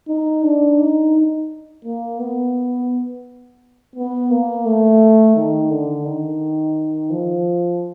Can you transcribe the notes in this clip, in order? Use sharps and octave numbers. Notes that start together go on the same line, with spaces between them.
D#4
D4
D#4
A#3
B3
B3
A#3
A3
D#3
D3
D#3
F3